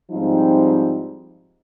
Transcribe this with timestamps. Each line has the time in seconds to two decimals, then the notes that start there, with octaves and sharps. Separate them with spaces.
0.11 G#2 F3 G3 C4 D#4 F4